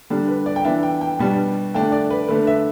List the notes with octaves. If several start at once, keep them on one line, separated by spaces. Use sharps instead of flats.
D3 G3 D4
B4
D5
G5
E3 B3 D4 E5
G5
G5
B2 G3 B3 D4
D3 A3 D4 G5
D5
B4
D3 A3 D4 B4
E5